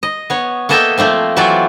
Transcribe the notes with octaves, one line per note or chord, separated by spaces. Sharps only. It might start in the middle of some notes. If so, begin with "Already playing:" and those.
D#5
B3 C#5
A#3 B3 A4 D#5 E5 G5
F3 A3 A#3 C4
E3 F#3 G3 F4 F#4 D5